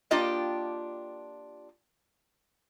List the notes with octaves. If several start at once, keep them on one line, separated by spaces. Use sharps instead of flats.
A#3 D4 F4 G4 D#5 G5